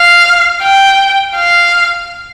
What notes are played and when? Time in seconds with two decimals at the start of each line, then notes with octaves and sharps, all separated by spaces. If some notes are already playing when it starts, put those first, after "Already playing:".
Already playing: F5
0.63 G5
1.35 F5